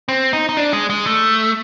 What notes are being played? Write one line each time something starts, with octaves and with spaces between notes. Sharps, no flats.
C4
D#4
D#4
D4
G#3
G#3
A3